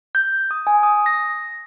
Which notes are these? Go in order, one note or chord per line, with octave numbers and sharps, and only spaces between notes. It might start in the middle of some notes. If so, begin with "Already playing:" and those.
G6
D#6
G#5
D#6
A#6